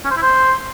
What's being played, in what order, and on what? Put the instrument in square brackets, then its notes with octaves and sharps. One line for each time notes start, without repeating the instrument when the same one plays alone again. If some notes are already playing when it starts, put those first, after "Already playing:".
[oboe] C#4
C5
E4
C5